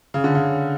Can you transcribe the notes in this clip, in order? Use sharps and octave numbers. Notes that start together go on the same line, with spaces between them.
C#3
D3
C#3